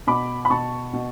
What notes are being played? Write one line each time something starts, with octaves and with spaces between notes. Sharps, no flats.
B2 B5 D6
B5
B2 A5 C#6
B2